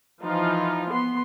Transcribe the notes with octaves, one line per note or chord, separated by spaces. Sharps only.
E3 F3 D#4 F4
B3 C6